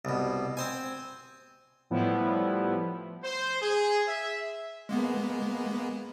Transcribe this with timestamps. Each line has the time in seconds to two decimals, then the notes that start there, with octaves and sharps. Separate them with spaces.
0.05 C2 B2
0.57 C4 C5 G#5
1.90 A2 F3 G3 B3 E4
3.24 C5
3.62 G#4
4.08 E5
4.89 G#3 A#3 B3